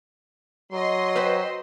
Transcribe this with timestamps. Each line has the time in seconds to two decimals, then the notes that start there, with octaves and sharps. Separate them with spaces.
0.73 F#3 D#5 C6
1.16 B4 C5 G5